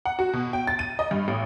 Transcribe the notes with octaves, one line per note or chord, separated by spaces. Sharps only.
F#5
F#4
B2
G5
A6
D#7
D#5
G2
A1